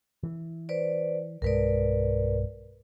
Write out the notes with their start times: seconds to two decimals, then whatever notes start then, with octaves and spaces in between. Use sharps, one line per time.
0.23 E3
0.69 B4 C5 D5
1.42 B1 G2 G#3 A#4 B4 D5